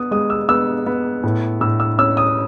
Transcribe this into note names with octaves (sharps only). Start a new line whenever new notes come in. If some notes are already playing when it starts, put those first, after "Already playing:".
Already playing: B3 D#6
G#3 D#6
E6
B3 E6
B3
A2
A2 E6
E6
C#4 E6
D#6